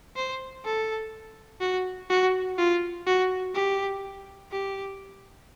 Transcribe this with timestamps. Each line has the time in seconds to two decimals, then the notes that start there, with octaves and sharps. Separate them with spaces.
0.16 C5
0.65 A4
1.61 F#4
2.10 F#4
2.58 F4
3.07 F#4
3.55 G4
4.52 G4